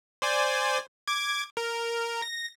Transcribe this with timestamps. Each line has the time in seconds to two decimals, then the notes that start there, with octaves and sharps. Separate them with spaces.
0.22 C5 D5 G#5
1.07 D6 G#6
1.57 A#4
2.22 A#6